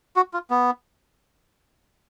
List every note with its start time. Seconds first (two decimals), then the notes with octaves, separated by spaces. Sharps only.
0.16 F#4
0.34 F4
0.50 B3